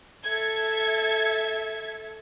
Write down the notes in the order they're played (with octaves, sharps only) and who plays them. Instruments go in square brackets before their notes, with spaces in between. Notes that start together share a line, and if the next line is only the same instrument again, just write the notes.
[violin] A4 E5 [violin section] G#6